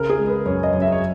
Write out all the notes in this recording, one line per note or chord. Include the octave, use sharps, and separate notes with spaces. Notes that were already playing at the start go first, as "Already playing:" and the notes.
Already playing: C#3 A#4
G#4
G#3
B4
F#2 C#5
D#5
F#2
E5
C#5